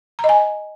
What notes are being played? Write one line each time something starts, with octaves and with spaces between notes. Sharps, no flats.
A#5
D#5
G#5